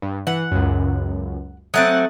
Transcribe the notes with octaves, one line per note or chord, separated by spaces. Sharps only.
G2
E3 F#5
C#2 F#2
F#3 A3 C4 D#6 F#6 A6